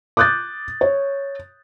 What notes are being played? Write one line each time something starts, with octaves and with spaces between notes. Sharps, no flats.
D6 D#6 F#6 G6 A6
C#5